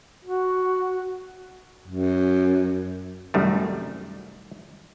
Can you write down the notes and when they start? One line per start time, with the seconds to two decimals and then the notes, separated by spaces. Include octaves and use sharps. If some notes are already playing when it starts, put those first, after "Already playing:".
0.25 F#4
1.88 F#2
3.34 C2 F#2 D#3 G3 A3